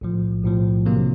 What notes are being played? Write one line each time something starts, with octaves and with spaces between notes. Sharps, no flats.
B1 A2 F3
B1 A2 F3
C3 D#3 F#3 A#3